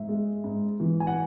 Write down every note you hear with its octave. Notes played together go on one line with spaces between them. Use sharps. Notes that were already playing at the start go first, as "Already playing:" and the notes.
Already playing: G#2 E5
G#3
G#2
E3
G#5
F#5